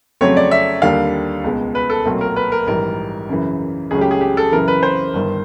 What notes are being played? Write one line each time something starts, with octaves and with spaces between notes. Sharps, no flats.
F2 C#3 F#3 A3 C4 C#5
D5
E5
D#2 D3 G3 A#3 D4 F5
C#2 B2 G#3
B4
A4
B1 A#2 F#3 A3 C4
A#4
B4
A#4
A#1 G#2 E3 G3 A#4
F#2 C#3 E3
C#2 C#3 F#3 A3 C#4 G#4
G4
G#4
G4
A4
F#2 C#3 E3 A#4
B4
C5
G1 G2 D#3